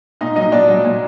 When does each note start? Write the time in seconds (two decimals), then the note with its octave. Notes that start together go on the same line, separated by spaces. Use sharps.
0.21 A#2 D#4 D#5
0.36 F#3 D#4 D#5
0.52 A#2 D4 D5
0.68 F#3
0.84 A#2